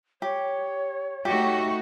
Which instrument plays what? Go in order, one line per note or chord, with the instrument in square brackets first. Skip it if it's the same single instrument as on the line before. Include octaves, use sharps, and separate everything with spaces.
[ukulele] G4 [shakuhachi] C#5
[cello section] A3 D#4 F#4 [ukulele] G4